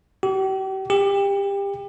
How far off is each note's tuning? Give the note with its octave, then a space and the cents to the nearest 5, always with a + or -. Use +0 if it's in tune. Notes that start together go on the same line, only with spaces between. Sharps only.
G4 -40
G4 +25